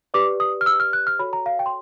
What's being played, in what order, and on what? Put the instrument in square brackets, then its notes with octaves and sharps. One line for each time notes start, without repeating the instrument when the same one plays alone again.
[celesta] G4 B4 D5 D6
D#6
F6
E6
F6
F#6
F6
F#4 A4 C#5 B5
A#5
F5
G5
C6